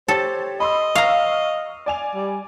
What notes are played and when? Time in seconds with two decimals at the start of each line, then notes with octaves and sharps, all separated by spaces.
0.08 G4 A4 C5 C#5 A6
0.60 D#5 B5 C6 E6
0.95 F5 A#5 C#6 E6 F6
1.86 D5 G#5 F7
2.15 G3